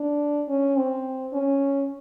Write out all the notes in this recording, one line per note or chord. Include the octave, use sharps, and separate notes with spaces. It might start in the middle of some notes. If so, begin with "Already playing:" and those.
Already playing: D4
C#4
C4
C#4